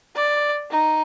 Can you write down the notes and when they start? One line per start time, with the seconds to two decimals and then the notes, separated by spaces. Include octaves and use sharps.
0.16 D5
0.70 D#4